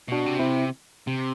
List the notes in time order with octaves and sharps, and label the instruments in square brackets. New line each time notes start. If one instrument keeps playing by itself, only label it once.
[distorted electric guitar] B2 [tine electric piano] D4 F#4
[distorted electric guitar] C3
[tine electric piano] C4 E4
[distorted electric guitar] C3